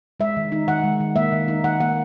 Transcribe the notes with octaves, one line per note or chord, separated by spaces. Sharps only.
G#3 E5
D#3
D#4
D#3 F#5
G#3
D#3
A#3 E5
D#3
D#4
D#3 F#5
A#3 F#5